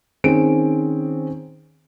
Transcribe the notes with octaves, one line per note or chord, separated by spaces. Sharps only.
D#3 C4 C#4 G#4 D7